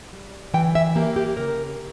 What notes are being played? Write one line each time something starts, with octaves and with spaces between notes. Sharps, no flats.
G3
E3 G5
E5
A#3 G4
G4
C#3 A#4